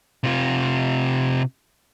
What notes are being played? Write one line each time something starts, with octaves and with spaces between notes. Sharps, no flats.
C3 F4